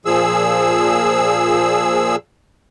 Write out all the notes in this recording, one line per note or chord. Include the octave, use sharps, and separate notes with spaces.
A#2 F3 G#4 E6